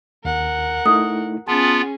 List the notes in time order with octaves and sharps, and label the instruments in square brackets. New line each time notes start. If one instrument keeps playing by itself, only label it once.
[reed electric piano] D#2 [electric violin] A#4 F#5
[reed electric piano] A3 D#4 E4 [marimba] D#6
[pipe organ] B3 F4 [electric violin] C#4 G#4 [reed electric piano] A5